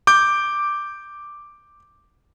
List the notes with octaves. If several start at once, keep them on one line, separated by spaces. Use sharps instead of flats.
D6 G6